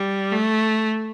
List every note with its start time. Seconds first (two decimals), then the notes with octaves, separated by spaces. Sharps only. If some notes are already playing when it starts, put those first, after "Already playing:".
Already playing: G3
0.32 A3